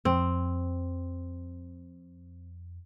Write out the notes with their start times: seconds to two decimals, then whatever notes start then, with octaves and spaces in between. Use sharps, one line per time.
0.05 F2 C4